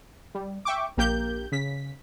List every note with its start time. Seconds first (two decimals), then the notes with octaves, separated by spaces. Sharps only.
0.35 G3
0.65 E5 G5 C#6 D6
0.97 A#1 A#3 G4 A#4 G6
1.52 C#3 B6